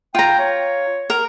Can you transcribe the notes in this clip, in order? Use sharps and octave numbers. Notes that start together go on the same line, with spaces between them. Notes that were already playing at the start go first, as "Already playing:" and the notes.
F4 G5 A#5
C#5
A#4